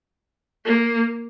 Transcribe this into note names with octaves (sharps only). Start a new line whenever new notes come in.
A#3